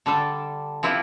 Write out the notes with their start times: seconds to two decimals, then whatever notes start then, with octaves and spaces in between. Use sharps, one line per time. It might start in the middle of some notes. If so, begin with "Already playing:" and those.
0.06 D3 G3 D4 A4
0.83 F3 C4 E4 G4